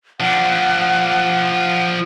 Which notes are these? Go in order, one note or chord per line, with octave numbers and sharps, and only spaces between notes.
F3 D4 F#5